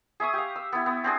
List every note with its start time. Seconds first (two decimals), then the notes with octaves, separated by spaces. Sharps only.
0.20 G#4 E5 C#6 D#6
0.33 G4 F5
0.56 E6
0.72 B3 E4
0.86 B3
1.04 C4 D4 G#4